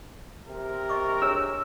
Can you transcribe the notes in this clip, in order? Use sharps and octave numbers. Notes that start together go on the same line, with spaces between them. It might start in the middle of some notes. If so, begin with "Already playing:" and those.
C3 A#4
D#5 C#6 D6
D4 G#4 C#5 E6